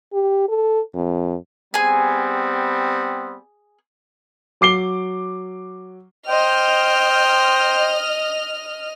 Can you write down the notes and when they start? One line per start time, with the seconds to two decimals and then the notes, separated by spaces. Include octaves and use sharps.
0.13 G4
0.49 A4
0.95 F2
1.74 G3 B3 C4 G#4 G#5
4.61 F#3 D6 C7 G7
6.28 C5 D#5 G5 F6